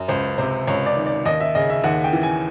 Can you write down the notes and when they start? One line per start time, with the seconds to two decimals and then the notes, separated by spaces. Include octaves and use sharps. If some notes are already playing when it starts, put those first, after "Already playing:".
Already playing: F#2
0.08 C#2 C5
0.38 C3 C5
0.67 C#2 C#5
0.86 D5
0.96 D#3
1.06 D5
1.26 D#2 D#5
1.40 E5
1.55 C#3 D#5
1.70 E5
1.84 D#2 F#5
2.04 G5
2.13 E3
2.23 G#5